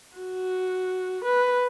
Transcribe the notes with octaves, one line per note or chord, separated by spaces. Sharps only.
F#4
B4